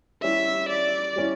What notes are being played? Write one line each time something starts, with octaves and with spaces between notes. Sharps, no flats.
G3 C#4 E4 E5
D5
G3 C#4 E4